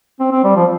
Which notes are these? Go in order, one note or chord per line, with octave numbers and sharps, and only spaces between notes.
C4
C4
G3
F3